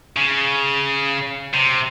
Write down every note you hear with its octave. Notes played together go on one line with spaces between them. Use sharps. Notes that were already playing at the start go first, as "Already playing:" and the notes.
C#3
C3